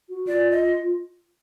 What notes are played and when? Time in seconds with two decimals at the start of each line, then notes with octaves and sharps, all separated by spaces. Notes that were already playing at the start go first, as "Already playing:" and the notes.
0.10 F#4
0.27 F4 D5
0.51 D#5